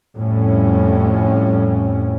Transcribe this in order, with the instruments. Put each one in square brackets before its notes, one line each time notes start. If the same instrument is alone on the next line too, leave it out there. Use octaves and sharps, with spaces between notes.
[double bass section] F2 A2 G3 C#4